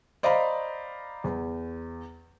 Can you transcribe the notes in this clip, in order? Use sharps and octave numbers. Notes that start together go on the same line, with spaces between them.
C5 D5 D#5 F5 A#5 B5
E2